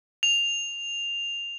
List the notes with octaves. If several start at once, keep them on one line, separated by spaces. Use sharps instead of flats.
F7